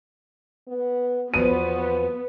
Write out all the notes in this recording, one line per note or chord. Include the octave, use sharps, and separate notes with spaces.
B3
E2 F3 B3 F#4 D#7